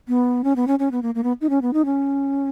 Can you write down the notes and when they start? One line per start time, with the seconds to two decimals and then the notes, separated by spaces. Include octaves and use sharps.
0.08 B3
0.44 C#4
0.56 B3
0.68 C#4
0.79 C#4
0.92 B3
1.03 A#3
1.15 A#3
1.24 B3
1.41 D#4
1.50 C#4
1.62 B3
1.73 D#4
1.85 C#4